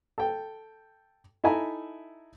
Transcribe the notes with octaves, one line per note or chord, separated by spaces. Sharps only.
A4 G5
D#4 E4 A4 E5 G#5 A#5